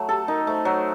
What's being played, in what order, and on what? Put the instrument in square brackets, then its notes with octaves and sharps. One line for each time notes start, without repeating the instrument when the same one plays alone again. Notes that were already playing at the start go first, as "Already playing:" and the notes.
Already playing: [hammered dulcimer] F#3 A3
[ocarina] G4 [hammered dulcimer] A4
[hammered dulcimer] D#4 [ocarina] A#4
[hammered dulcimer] A3 [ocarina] C5
[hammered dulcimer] F#3